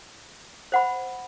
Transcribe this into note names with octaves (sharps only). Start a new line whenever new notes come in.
C5 F#5 B5